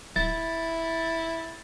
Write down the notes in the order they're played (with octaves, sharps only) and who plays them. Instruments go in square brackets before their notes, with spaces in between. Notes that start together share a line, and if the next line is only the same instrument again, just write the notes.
[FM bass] D1 [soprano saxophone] E4 [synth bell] A6